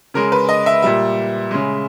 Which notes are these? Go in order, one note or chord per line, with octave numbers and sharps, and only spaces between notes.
C#3 G#3 A#4
B4
D#5
E5
A#2 G3 E5
C#3 G#3